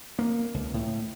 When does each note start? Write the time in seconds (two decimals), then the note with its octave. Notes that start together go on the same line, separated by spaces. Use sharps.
0.19 A#3
0.54 C#2
0.74 A2